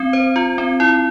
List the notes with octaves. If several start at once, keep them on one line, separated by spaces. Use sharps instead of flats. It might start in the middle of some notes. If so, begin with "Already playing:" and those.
Already playing: C4
C5
F4
C4
E4